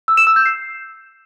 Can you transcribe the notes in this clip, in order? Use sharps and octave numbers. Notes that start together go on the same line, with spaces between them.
E6
E7
E6
G6
C7